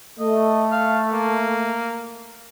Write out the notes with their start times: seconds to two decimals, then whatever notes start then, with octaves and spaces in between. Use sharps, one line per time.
0.20 A3 D#5
0.72 F5
1.13 A#3